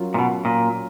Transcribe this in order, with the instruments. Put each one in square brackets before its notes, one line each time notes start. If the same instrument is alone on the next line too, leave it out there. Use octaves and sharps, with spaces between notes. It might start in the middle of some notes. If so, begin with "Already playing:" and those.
Already playing: [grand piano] F#3 C#4 F4 A#4
[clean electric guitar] A#2
B2
A#2